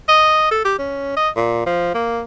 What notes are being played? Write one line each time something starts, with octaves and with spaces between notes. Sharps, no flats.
D#5
A4
G4
C#4
D#5
A#2
F3
A#3